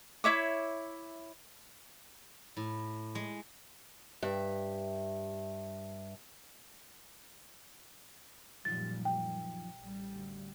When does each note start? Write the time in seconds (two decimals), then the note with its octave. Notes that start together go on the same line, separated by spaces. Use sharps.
0.24 E4 C#5 E5 D6
2.57 A2
3.15 G#3
4.22 G2 E5
8.65 F#2 A#2 D#3 F3 G3 A6
9.05 G5
9.78 A1 G3
10.16 D2